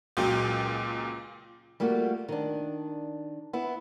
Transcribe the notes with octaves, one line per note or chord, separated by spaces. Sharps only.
C#2 A#2 F#3 G5
G3 A3 A#3 F4 F#4
D#3 D4
B3 E4